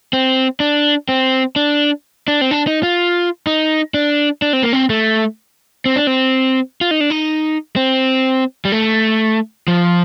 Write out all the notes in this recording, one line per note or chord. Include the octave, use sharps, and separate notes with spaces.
C4
D4
C4
D4
D4
C4
D4
D#4
F4
D#4
D4
D4
C4
A#3
C4
A3
C4
D4
C4
F4
D#4
D4
D#4
C4
G3
A3
F3